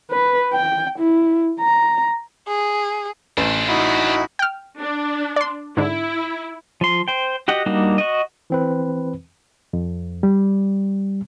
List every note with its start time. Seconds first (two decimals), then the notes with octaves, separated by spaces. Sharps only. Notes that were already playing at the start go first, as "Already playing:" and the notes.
0.12 B4
0.53 G5
0.99 E4
1.60 A#5
2.48 G#4
3.38 A1 D4 C5
3.69 D#4 E4 F#4
4.39 G5 F6
4.80 D4
5.36 D5 C6
5.77 G#2 D3 E4
6.81 F3 C6
7.08 C5 G5
7.48 F#4 G4 D#5 F#5
7.66 G3 A#3 D4 D#4 F#4
7.98 F#4 D#5
8.50 E3 C4 B4
9.73 F2
10.23 G3